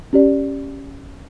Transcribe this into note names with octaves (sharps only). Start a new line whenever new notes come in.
C#4 G4 D5